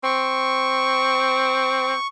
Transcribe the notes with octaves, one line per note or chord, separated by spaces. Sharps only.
C4 C#6